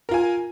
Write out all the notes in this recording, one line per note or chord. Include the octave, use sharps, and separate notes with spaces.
F4 A#4 G#5